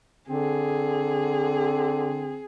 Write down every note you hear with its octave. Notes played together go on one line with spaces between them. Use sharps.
D3 C4 G#4